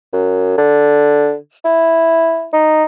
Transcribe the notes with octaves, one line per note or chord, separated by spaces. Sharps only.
F#2
D3
E4
D#4